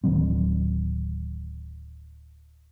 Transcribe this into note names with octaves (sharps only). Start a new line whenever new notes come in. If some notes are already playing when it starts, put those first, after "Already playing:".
D1 D#3 F#3 C4